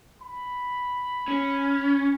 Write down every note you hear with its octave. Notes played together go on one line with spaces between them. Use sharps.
B5
C#4